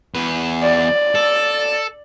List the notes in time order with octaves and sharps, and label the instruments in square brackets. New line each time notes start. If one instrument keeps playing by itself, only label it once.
[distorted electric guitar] E2 B4
[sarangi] D5
[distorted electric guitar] A4